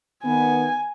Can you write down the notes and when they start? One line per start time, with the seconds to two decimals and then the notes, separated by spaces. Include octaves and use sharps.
0.24 D#3 B3 G#5